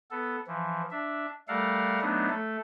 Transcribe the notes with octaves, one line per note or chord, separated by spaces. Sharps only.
B3 A4
E3 F3
D4 E5
G3 A3 A4 A#4 F5 F#5
F#3 A3 B3 D4 D#4
A3 A4